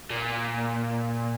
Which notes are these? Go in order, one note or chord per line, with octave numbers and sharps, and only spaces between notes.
A#2